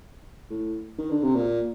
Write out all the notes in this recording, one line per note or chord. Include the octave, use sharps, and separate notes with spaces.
A2
D#3
D3
C3
A#2